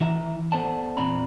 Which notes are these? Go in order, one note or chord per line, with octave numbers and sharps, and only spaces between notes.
E3 E4 E5 A#5
B3 A4 C5 D5 A5
E2 A#2 C4 D5 A#5 B5